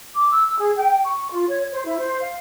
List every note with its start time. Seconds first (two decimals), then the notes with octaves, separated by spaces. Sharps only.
0.15 D6
0.31 E6
0.58 G#4
0.76 G5
1.05 C#6
1.31 F4
1.47 C#5
1.72 C5
1.84 E4
1.98 C5
2.22 F5